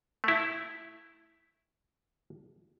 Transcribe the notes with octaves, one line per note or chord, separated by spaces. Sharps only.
A3 E4